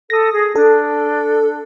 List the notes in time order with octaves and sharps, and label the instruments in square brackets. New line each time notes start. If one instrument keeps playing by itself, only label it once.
[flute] A4 [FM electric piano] D#6 A#6
[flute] G#4
[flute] D4 [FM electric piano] A4